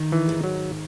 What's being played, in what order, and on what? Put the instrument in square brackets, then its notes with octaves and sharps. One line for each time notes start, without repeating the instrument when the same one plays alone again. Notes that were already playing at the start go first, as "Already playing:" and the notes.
Already playing: [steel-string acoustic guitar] D#3
[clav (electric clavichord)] E3
[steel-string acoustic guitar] G#2
[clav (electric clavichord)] F#3